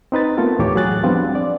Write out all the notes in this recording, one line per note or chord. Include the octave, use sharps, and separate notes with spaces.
C4 D#4 B4 A6
A3 B3 F4 A4 A#4
D#2 A2 E3 G4 C#5 D6
F#3 G#4 F#6 A6
F3 G3 B3 C4 D4 F4
D5